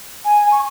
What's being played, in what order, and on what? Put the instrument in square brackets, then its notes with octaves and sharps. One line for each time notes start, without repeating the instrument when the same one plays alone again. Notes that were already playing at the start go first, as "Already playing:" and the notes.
[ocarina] G#5
C#6